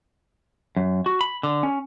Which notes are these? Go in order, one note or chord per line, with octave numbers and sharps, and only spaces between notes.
F#2
F#4
B5
D3
C#4